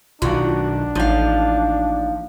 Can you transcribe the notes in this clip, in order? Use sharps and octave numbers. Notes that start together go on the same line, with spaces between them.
B1 D#3 D4 F4 F#4
A1 D#2 F3 F5